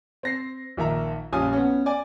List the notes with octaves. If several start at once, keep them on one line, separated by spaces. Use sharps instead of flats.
C4 A#6 C7
A#1 D#3 E5 A#5
A#1 G3 C#4 F4 G#5 D#6
B3 C#4
D5 G#5